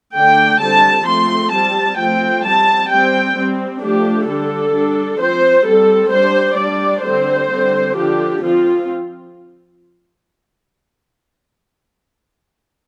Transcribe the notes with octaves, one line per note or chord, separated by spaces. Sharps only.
D3 A3 D4 G5
D3 G3 C4 A5
F3 A3 C4 C6
G3 C4 A5
F3 A3 C4 G5
G3 C4 A5
G3 C4 G5
G3 C4
F3 A3 D4 G4
D3 G3 D4 A4
G3 D4
F3 C4 C5
G3 C4 A4
G3 D4 C5
G3 D4 D5
D3 G3 C4 C5
D3 G3 C4
D3 F3 D4 G4
F3 C4 F4